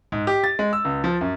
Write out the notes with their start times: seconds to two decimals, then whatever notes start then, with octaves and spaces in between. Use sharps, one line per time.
0.12 G#2
0.27 G4
0.44 A6
0.59 G#3
0.73 E6
0.85 C#2
1.04 F3
1.21 F#2